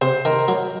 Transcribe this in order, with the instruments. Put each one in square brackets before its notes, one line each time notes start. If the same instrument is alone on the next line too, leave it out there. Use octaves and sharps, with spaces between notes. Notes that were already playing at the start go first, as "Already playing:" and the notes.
[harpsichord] C3 [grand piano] C5
[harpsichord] D#3 [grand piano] A#4
[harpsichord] F#3